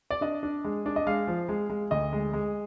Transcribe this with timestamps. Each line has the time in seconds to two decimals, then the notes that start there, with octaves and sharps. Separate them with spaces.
0.10 D5
0.21 D4 D#5
0.43 D4
0.64 G#3
0.86 D4
0.96 D#5
1.07 G#3 F5
1.27 F3
1.49 G#3
1.70 G#3
1.91 D2 D#5
2.13 G#3
2.33 G#3